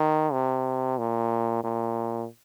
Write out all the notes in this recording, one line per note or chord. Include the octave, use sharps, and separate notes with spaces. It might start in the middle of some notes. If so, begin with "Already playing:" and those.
Already playing: D#3
C3
A#2
A#2